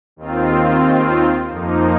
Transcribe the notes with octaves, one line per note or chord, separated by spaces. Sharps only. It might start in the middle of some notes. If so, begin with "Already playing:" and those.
D#2 D#3 C4 F4
F2 F3 A#3 D#4